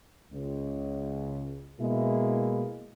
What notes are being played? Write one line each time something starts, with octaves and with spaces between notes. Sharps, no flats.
C#2
B2 G#3 A#3 E4